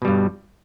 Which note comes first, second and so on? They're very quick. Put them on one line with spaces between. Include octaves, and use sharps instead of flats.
B2 G3 G2